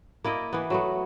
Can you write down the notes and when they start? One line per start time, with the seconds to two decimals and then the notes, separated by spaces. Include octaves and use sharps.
0.24 A#3 E4 D5 D#5
0.53 E3 B3
0.70 F#3 A3 B3